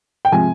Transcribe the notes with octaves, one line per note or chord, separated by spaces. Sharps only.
G5
C3 F3 G#3 G#5